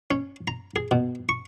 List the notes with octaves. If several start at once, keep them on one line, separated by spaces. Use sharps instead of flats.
C#4
A#5
G#4
B2
C#6